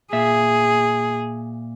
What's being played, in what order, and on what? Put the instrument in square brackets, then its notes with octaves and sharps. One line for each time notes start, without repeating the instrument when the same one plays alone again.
[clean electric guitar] A#2 E5 [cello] G#4